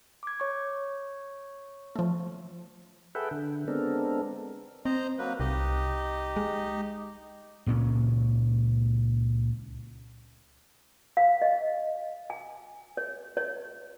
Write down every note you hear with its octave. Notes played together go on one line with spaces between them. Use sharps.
D6 G#6
C#5 C#6
F3 A3
G#4 A4 B4 E5 F#5 G5
D3
G#3 B3 C4 D4 A4 A#4
C4 C5 D#5 A#5
F#3 A#3 B4
C2 D#4 G4 D#5
G#3
C#2 A#2 C4 C#4
F5
D#5
G#5
C#5
C#5